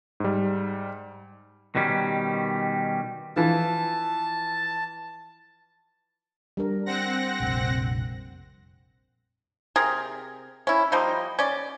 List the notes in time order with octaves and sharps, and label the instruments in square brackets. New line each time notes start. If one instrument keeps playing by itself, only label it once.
[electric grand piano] G#2 G3
[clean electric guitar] B2 D#3 G3 C#4
[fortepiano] E3 F3 [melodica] A5
[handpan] G3 D4 A#4
[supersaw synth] C4 F#5 A#6
[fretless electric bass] F1 A#1
[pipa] C3 G#4 A#4
C#4 E4
F3 G3 A#3 D#4
C#4 D5